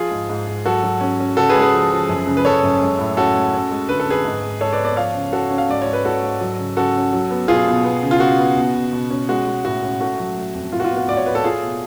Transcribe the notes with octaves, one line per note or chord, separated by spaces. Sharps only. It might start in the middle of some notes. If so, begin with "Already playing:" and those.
Already playing: F3 F4 G#4
G#2
G#2
G#2
F#3 F#4 A4
F#3
C#4
C#4
C#3 F#4 A4
G#4 B4
G#3
G#4 B4
F3
F3
F#2
C#3
B4
F#2 A4 C#5
F#2
G#3
A2
C#4 F#4 A4
G#3
C#4
G#3
D3 B4
A4
F2 G#4 B4
G#2
G#2
G#2 A4 C#5
B4 D5
B3
B4 D5
F3 C#5 F5
C#3
C#3 F#4 A4
C#4
F5
G#2 D5
G#2 C#5
B4
G#2 F#4 A4
G#2
F#3
C#3
C#3 F#4 A4
C#4
F#3
B3
B2 F4 G#4
B2
B3
C#3
F4
C#3 F#4
B3
B2
B2
B2
C#4
G#3 F#4
G#3
A2 F#4
C#4
A3 F#4
F#3
A3
F2
A2 F4
F#4
F4
B3
F#4
A2 D5
C#5
A2 B4
A4
A3 F4 G#4
B2